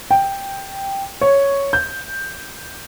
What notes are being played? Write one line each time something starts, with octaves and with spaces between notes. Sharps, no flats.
G5
C#5
G6